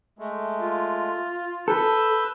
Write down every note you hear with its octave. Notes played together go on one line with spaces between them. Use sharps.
G#3 A3
F4
A4 B4 E6 G6